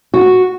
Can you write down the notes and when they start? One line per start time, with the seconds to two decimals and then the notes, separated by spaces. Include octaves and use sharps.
0.14 F#4